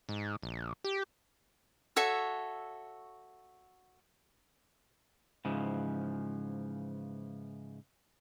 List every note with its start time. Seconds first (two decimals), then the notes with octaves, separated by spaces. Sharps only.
0.09 G#2
0.43 A#1
0.84 G4
1.96 F#4 A4 C#5 E5
5.45 G#2 C#3 E3 F3